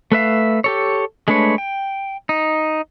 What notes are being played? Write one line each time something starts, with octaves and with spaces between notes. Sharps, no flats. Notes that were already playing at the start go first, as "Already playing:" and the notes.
A3 B4 E5 F5
G4 A4 C#5
G#3 A3 D4 B4 C#5
G5
D#4